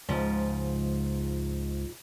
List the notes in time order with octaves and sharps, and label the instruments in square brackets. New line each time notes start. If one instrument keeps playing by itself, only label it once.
[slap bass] C#2 [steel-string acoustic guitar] G#2 C#3 F3